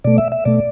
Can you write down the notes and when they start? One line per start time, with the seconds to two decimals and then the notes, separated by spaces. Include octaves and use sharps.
0.04 B2 A3 D5
0.18 E5
0.32 E5
0.45 B2 A3 D5